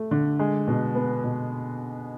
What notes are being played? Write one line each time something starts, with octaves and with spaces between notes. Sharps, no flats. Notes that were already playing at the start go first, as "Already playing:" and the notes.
Already playing: A3
D3
G#3
B2
B3
B2